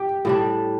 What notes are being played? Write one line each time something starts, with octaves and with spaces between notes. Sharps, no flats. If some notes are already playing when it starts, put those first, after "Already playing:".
Already playing: G4
A2 G3 D4